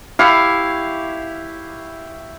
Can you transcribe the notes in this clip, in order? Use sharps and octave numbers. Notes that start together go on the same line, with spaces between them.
E4 G4 F5 C#6